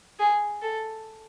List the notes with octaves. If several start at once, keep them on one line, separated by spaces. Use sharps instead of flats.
G#4
A4